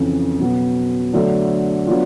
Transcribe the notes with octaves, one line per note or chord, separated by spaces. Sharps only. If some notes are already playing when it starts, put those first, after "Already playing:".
Already playing: F2 C#3 E3
B2 F#3 B3
D3 F#3 A3 D4
F#3 B3 D4 F4